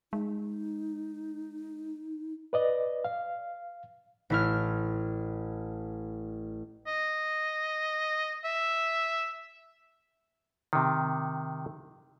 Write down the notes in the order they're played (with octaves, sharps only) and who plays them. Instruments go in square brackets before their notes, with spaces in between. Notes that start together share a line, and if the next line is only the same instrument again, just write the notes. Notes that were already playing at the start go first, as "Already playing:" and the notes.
[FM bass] G#3 [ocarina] D#4
[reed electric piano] B4 D5 D#5
F5
[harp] A1 E4 F6
[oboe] D#5
E5
[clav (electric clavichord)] C3 D#3